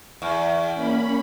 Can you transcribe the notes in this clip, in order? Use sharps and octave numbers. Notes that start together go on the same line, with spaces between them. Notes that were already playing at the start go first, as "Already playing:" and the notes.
E2
A#3 C#4 B5